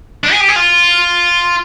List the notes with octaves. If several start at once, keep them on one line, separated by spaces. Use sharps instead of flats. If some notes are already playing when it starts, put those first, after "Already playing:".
D4
G#4
G4
G#4
F4